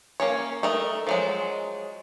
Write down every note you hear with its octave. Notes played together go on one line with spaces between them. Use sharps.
A#3 C#4 C#5
A3 A#4 D#5
F3 F#3 G#3